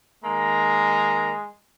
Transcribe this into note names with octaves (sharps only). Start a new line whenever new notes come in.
D#3 G#3 A#3 A#5